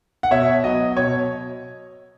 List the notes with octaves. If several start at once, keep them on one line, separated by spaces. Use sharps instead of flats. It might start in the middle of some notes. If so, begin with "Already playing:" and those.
F#5
B2 C#5 E5
F#3 B3 D#5
B2 C#5